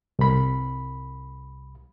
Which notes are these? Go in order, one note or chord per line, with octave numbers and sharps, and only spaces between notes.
C2 B5